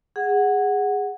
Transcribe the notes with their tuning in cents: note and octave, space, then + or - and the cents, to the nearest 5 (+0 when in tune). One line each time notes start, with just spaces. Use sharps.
G#4 -15 F#5 +0